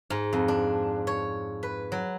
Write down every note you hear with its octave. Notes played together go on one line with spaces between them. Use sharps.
G#2
F2
D4
C#5
B4
F#3